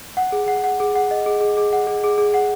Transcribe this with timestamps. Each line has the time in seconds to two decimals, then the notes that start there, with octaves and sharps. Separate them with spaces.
0.17 F#5
0.32 G#4
0.48 F#5
0.64 F#5
0.80 G#4
0.95 F#5
1.11 D#5
1.26 G#4
1.41 G#4
1.57 G#4
1.73 F#5
1.87 G#4
2.04 G#4
2.18 G#4
2.34 F#5